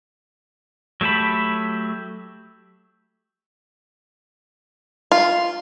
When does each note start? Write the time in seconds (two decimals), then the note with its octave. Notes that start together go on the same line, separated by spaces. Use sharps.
1.01 F#3 A3 G4 A5 B5
5.12 F4